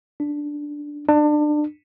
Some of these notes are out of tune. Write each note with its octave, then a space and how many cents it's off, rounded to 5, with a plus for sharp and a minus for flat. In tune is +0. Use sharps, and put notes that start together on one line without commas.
D4 -5
D4 +25